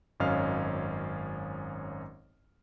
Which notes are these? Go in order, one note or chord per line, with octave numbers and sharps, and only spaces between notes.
G#1 F#2 C#4 D#5 F5 F6